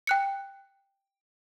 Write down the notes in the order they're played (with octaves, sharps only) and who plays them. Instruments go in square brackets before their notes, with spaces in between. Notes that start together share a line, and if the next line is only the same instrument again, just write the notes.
[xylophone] G5 F#6 C#7